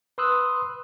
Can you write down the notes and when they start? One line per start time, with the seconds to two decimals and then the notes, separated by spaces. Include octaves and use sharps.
0.18 B4 C6 D#6 E6 F#6